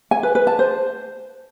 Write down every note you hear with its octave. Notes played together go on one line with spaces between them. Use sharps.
G#5
B4
B4
A5
C5